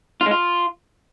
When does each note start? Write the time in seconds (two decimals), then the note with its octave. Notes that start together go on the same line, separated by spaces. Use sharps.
0.21 F4
0.26 G#3
0.31 F4